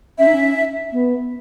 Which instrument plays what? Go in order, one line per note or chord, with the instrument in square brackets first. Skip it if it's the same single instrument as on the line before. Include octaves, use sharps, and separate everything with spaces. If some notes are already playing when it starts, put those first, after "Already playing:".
[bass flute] C#4 [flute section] E5
[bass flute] D#4
C#4
B3